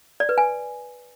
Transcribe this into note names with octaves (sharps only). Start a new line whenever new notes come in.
D5
B4
G#5